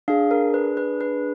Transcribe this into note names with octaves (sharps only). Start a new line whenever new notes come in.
D4 G#4 F5
A#4
B4
B4
B4